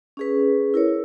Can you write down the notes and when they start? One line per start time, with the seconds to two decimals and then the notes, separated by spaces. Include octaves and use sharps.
0.17 C#4 G#4 B4
0.74 E4 A#4 C#5